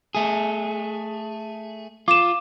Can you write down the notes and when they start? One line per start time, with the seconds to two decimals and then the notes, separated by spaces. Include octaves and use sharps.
0.15 A3 G#4
2.08 F4 D6 E7